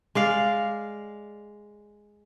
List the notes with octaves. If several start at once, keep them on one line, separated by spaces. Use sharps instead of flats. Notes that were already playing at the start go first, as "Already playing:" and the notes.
G#3 D5 F5